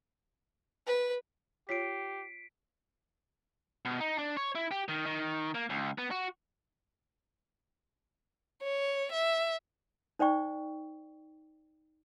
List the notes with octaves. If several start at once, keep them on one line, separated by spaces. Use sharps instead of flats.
B4
F4 G4 C#5 B6 C7 D7
B2
D#4
D4
C#5
E4
G4
D#3
D#3
A#3
C#2
B3
F#4
C#5
E5
D#4 C5 D5 G5 C#6